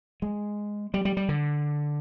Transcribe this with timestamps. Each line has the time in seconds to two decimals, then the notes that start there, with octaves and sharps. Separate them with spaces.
0.22 G#3
0.94 G3
1.05 G3
1.17 G3
1.29 D3